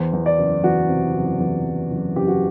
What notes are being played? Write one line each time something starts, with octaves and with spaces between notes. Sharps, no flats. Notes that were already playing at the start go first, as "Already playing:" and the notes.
Already playing: E2 C5
E2
D5
F#1
E2 F#4
C3
F#1
E2
F#1
F#1
F#1 G4
F#4